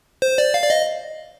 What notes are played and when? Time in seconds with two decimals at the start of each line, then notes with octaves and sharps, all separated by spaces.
0.22 C5
0.38 D5
0.54 F5
0.64 D5
0.70 D#5